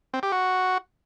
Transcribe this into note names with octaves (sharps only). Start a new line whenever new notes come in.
C4
G4
F#4